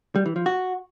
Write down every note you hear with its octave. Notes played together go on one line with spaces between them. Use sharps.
G3
E3
F3
F#4